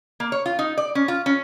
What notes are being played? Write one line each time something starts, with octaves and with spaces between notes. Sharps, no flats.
A#3
C#5
F4
D#4
D5
C#4
F4
C#4